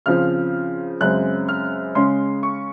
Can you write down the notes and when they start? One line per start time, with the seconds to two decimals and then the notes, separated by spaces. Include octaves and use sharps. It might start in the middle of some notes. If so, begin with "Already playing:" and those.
0.06 C#3 F3 C4 F6
1.01 F#2 C#3 G#3 C4 F#6
1.48 F6
1.95 C#3 G#3 C#4 C6
2.43 C#6